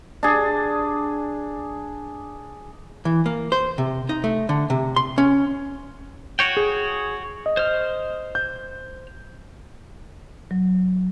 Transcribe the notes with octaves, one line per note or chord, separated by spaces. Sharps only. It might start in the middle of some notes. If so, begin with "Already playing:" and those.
D4 G#4
E3
A#3
C5
C3
D#4
A3
D3
C3
C6
C#4
F#4 C#5 G5
G#4
D#5
C5 F6
G6
F#3